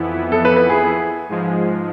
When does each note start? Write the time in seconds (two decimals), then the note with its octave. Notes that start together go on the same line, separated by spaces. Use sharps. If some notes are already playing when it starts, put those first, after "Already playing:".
Already playing: F2 E3 B3 E4
0.32 A4
0.45 B4
0.56 B4
0.69 G#4
1.29 G#2 F3 G#3